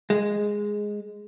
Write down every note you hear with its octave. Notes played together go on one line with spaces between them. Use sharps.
G#3